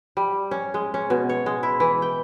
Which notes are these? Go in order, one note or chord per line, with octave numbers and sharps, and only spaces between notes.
G3
C#4
G#3
C#4
B2
C#5
G#3
E4
E3
G5